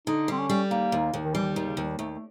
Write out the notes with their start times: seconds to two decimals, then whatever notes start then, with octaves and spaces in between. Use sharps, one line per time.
0.07 D3 D#4
0.28 G3 C4
0.39 C#4
0.49 G3
0.71 D#2 A#3
0.92 D#2
1.14 D#2
1.25 D#3
1.34 E3 G3
1.50 D#3
1.56 D#2
1.66 C#3
1.77 D#2
1.83 G3
1.98 D#2 A3
2.15 A3